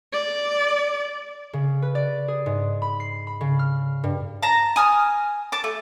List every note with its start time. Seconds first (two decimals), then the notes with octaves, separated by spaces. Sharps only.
0.13 D5
1.53 C#3
1.82 B4
1.95 D5
2.28 G#4
2.46 G#2
2.82 B5
3.00 C7
3.27 B5
3.41 C#3
3.59 F6
4.04 G2
4.43 A5 A#5
4.76 G#5 D#6 F6
5.52 A5 D6
5.64 A3